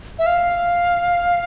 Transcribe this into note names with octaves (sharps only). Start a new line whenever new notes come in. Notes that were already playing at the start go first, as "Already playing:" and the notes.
E5
F5